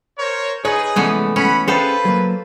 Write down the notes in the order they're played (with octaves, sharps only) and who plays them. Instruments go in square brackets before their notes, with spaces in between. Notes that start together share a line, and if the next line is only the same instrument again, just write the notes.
[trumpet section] A#4 C5 C#5
[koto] D#4 B4 [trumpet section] G#4 [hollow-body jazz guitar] C#5
[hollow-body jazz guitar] C2 G#3 A3 [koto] E3 B3 C#4
[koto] C#4 [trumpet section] F#5 B5
[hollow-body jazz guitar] C#4 G#4 G5 [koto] F4 A4 C5 [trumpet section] B4
[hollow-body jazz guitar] F#3 A#3